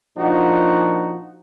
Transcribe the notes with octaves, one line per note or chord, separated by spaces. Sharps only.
A#2 F3 D4 D#4 F#4